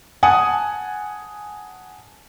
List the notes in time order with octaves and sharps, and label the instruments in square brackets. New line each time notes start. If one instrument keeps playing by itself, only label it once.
[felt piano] F#5 G#5 A5 D#6